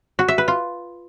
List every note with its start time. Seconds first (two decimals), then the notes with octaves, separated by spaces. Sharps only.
0.19 F#4
0.28 E5
0.38 B4
0.48 F4